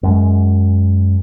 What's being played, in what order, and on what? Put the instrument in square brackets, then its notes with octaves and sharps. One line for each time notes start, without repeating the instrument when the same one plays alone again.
[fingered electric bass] F#2 G#3